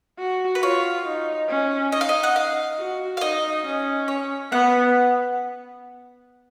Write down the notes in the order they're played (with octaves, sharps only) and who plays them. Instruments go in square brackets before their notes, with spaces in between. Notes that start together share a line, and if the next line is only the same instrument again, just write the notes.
[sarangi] F#4
[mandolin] B4
[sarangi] F4 [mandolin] C#5
[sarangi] D#4
C#4
[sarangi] D#4 [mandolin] D#5
[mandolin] F5
D#5
F#5
F5
[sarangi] F#4
[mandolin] F5
[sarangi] D#4 [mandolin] D#5
[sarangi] C#4
[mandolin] C#5
[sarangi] B3 [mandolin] F#5